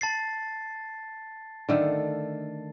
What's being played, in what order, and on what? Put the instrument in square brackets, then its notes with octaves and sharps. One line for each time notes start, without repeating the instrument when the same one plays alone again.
[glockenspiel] A5 A6 C7
[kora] D3 D#3 A3